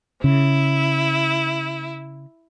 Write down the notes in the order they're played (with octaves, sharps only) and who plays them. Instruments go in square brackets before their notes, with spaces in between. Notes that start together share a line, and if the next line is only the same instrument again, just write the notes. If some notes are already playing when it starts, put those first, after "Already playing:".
[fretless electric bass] C#3 [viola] E4